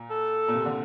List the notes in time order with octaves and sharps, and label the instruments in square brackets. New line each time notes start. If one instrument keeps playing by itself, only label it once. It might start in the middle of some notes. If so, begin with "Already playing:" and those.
Already playing: [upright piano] A#2
[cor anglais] A4
[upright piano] A#2
C3
D3